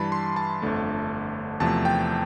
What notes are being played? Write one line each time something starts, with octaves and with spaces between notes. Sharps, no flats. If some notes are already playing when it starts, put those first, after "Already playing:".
Already playing: G2 E3 G3 A5 B5
C6
A5
G1 F2 D3 A3
E2 C3 F3 A3 A5
G5